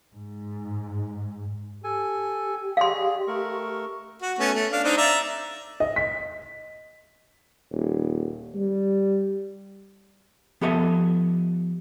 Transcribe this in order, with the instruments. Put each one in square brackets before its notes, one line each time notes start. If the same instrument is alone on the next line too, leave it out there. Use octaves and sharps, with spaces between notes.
[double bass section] G#2
[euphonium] G4 [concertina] A4 G#5
[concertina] G#4 D5 D#5 [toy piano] F5 C6
[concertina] A3 A#4 C#6
[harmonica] F#4
A3 B3 C#4
A3
D4 F5
C4 D4 D#4
D5 E5 A#5
[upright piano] D#5
B6
[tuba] D#1
G3
[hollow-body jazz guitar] F3 B3 G4 A4 D#5 E5